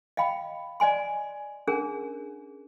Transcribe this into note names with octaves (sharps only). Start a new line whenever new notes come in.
D#5 F5 G5 B5
D5 D#5 G#5 C6
C#4 D4 G#4 A#4